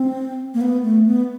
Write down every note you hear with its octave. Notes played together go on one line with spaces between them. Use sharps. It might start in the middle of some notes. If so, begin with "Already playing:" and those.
Already playing: C4
A#3
B3
A3
B3